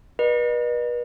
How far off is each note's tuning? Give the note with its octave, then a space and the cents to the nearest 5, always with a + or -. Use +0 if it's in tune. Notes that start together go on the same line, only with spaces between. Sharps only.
B4 -40 D#5 -45